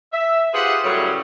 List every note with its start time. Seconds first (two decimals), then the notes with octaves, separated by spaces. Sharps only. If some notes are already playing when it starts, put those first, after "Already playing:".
0.13 E5
0.53 F4 G4 G#4 B4 C5 F#5
0.84 F#2 A2 C#3 F#3 G3